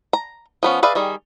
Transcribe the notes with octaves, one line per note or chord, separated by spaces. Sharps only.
A#5
F3 B3 C#4
G#4 B4 D5 E5 F5
D#3 G3 G#4